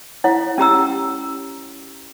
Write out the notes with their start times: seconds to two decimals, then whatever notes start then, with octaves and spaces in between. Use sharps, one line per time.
0.24 E4 C#5 F#5
0.58 C#4 G4 A#5 E6